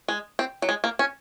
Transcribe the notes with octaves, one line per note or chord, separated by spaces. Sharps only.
G#3
C4
F#3
G#3
A#3
C#4